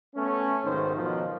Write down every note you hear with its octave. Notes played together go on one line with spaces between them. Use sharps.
A3 B3 C#4
B1 G#2 D#3 C5
B2 D#3 F3 F#3